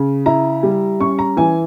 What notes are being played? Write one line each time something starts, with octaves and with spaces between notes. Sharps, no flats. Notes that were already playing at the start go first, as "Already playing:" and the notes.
Already playing: C#3
E4 A#5
G3
C#4 C#6
A#5
E3 G#5